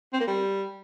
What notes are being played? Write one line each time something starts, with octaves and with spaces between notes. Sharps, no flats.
C4
A#3
G3